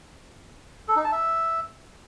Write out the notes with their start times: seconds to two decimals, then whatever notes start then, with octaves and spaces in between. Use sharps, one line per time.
0.89 A4
0.96 D#4
1.04 A5
1.12 E5